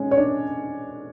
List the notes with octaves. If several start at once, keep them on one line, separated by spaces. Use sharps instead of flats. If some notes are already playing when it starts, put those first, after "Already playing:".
Already playing: G#3 C#4 C#5
C#5
D4 D5